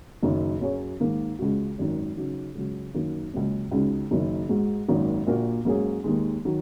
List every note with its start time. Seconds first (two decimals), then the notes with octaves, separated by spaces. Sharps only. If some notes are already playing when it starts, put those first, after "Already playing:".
0.23 F#1 F#2 D#3
0.61 F#2 F#3 C#4 G#4 C#5
1.00 G#2 D#3 A#3
1.39 C#2 C#3 G#3 F#4
1.78 G#1 F#2 D#3
2.17 C#3 F#3 D#4
2.55 C#2 C#3 F#3
2.94 F#2 D#3 A#3 D#4
3.33 C#2 C#3 F#3 A#3 C#4
3.71 C#2 C#3 G#3 D#4 F#4
4.11 F#1 F#2 D#3
4.49 G#2 G#3 F#4
4.88 G#1 F#2 D#3 A#3
5.27 A#1 A#2 A#3 F#4 A#4
5.65 G#2 F#3 A#3 C#4 G#4
6.04 D#2 D#3 G#3
6.45 D#3 F#3